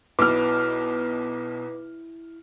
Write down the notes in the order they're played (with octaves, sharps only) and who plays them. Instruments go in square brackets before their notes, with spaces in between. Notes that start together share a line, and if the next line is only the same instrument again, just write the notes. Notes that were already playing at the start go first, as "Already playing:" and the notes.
[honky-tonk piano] B1 B2 [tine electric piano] E4 [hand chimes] B4 [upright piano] D6 F6